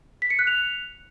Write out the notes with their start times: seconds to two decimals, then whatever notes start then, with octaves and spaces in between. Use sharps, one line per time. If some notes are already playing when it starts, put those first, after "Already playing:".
0.22 B6
0.30 C#7
0.39 F#6
0.47 F7